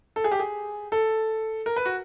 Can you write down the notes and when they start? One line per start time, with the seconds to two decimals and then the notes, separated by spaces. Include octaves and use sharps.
0.16 A4
0.24 G#4
0.32 G4
0.39 G#4
0.92 A4
1.66 A#4
1.76 B4
1.85 F#4